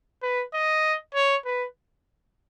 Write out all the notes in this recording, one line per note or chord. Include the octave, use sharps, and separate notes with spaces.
B4
D#5
C#5
B4